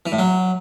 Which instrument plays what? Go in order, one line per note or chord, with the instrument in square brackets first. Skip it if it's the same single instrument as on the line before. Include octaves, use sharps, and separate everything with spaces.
[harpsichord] E3
A2
F#3